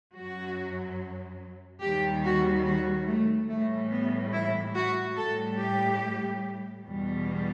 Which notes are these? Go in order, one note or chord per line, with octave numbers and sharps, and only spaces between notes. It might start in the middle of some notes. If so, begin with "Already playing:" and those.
F#2 F#3 F#4
D#2 D#3 G3 G4
F#4
F#4
A3
A2 E3 G3 A3
B3
E4
F#4
A2 G3 A4
G4
E2 B2 G3